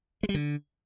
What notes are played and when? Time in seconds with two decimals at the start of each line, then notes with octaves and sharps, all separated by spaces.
0.23 G#3
0.29 G3
0.34 D3